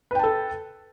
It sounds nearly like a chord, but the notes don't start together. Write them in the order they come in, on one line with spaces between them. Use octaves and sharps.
B4 G5 A5 A4